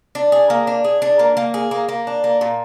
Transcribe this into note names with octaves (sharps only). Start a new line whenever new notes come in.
D4
G#4
A#3
D4
G#4
D4
A#3
A#3
G#4
A#3
A#3
D4
A#3
A#2